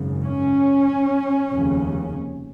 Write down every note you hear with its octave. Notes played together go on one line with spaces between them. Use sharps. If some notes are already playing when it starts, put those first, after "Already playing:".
Already playing: G#1 F#2 C#3
C#4
F1 D#2 C#3